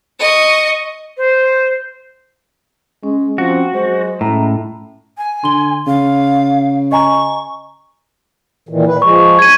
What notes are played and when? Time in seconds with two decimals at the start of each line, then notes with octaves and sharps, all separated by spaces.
0.20 D#5 C#6
1.17 C5
3.03 G#3 C#4
3.38 F3 C4 F#4
3.73 F#3 G#3 C5
4.21 A2 C#4 E5 A#5
5.18 G#5
5.44 D3 C6 G7
5.87 C#3 F5
6.92 D#5 G#5 A#5 C#6
8.69 A#2 D#3 E3
8.87 A#2 B4
9.02 F3 G#3 C#6
9.39 G#6 D#7